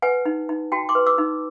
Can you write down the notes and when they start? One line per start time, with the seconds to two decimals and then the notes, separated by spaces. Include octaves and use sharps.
0.02 B4 F#5 G#5
0.26 D#4
0.49 D#4
0.72 F#4 G5 A5
0.89 C6 D6
0.95 B4
1.07 D6 E6
1.18 D#4